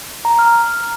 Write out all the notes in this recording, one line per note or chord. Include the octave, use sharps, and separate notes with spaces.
A#5
F6